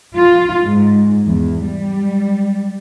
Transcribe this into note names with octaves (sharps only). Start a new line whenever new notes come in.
F4
G#2
E2
G3